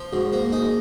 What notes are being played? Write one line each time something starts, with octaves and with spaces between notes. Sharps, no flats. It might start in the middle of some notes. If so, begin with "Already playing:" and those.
Already playing: F3
G#2 F#4
A#3
D#4 G#4